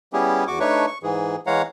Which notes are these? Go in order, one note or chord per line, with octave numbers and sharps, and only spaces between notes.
G3 B3 C#4 E4 G4 G#4
E2 F#4 C#6 D6
A3 D4 D#4 B4 C#5 C#6
C#6
G#2 E3 G#4
E3 G#3 C#5 F5 F#5 A#5